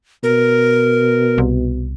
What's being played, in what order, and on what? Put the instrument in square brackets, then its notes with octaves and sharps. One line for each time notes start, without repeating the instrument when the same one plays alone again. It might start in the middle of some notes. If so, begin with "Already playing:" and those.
[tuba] B2 [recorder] A#4
[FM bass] C2